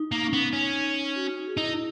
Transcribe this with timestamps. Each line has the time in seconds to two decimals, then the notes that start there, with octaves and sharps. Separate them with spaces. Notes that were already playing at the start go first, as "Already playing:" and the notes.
Already playing: D#4
0.12 A#3
0.27 C#4
0.33 B3 D#4
0.53 C#4
1.16 F#4
1.26 D#4
1.37 F#4
1.47 G#4
1.57 D#4 E4